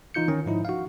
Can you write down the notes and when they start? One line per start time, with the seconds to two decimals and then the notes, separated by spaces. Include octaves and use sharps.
0.14 E3 D#4 F4 G6 C#7
0.28 D#3 C#4
0.46 G#2 F3 D#4 E4
0.65 F#4 F5